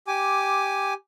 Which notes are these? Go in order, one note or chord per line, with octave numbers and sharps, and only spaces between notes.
G4 G#5 D6